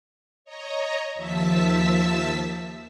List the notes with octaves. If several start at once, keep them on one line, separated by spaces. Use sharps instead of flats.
C#5 D#5 A#5
D#2 F3 E5 A5 E6 B6